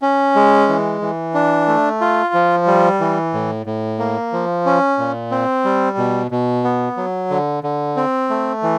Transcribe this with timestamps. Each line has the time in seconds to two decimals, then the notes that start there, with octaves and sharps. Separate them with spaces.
0.02 C#4
0.36 G#3
0.69 E3
1.01 E3
1.34 D4
1.68 A3
2.01 F4
2.34 F3
2.67 G3
3.00 E3
3.34 A2
3.66 A2
3.99 A#3
4.33 F3
4.66 C#4
4.99 A#2
5.31 C4
5.65 G3
5.98 B2
6.31 B2
6.64 B3
6.97 F#3
7.31 D3
7.64 D3
7.96 C4
8.30 A3
8.63 E3